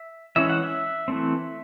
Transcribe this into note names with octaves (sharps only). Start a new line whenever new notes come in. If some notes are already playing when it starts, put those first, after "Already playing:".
Already playing: E5
E3 G#3 C#4 E5
F#5
E5
E3 A3 C4